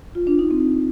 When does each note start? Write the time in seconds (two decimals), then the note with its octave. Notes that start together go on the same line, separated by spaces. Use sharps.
0.15 F4
0.27 D4
0.39 D#4
0.51 C4